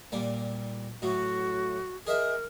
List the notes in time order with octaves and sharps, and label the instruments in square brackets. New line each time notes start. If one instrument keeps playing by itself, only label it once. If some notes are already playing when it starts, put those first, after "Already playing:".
[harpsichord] A#2 G3 A#3
[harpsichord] A2 F#3 [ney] F#4
[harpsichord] G#4 D#5 E5 [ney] A#4